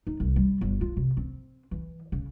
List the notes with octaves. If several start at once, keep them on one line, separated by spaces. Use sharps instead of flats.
D#4
C2
G3
G1
F4
C3
C4
E3
C#3